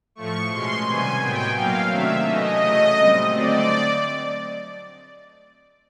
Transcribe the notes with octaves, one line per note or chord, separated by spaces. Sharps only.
A2 F3 A3 C#6
B2 G#3 C#4 C6
C3 D#3 G3 B3 G#5
A2 F#3 B3 G5
B2 F#3 A#3 C#4 F5
C3 D#3 F#3 A3 D4 E5
E3 A3 C#4 D#5
C#3 F#3 A3
A#2 G3 C4
D3 F#3 A3 C4 D5